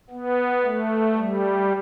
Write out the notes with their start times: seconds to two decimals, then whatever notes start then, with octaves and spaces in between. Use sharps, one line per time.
0.10 B3
0.63 A3
1.17 G3